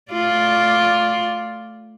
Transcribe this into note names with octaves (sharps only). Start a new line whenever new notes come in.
A3 F4 D5